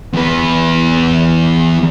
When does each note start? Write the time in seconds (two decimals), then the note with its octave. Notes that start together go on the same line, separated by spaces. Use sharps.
0.13 E2 B4